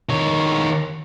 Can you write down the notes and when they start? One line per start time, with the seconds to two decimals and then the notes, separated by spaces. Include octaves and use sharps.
0.09 D#3 C#5